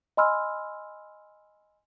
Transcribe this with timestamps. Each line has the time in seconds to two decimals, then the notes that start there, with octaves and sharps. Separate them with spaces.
0.17 D#5 G#5 B5 C6 E6 F6